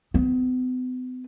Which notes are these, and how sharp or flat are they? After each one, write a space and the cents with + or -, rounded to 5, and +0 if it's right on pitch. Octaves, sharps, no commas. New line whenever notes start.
B3 +45